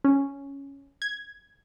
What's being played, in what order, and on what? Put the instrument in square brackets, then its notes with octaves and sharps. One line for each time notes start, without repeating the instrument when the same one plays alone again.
[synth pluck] C#4
G#6